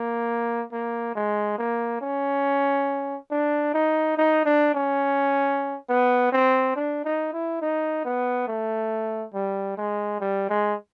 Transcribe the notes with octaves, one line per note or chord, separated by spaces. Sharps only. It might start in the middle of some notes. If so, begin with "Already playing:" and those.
Already playing: A#3
A#3
G#3
A#3
C#4
D4
D#4
D#4
D4
C#4
B3
C4
D4
D#4
E4
D#4
B3
A3
G3
G#3
G3
G#3